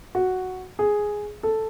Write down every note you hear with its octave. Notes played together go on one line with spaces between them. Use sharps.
F#4
G#4
A4